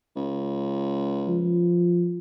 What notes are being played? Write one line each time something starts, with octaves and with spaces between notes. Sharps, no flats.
C#2
F3